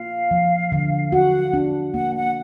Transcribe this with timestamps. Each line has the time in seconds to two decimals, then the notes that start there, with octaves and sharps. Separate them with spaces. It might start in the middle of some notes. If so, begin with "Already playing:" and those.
Already playing: A#3 F4 F5
0.31 F3
0.72 D3
1.12 F#4 F#5
1.53 D4
1.94 A#3 F#5
2.15 F#5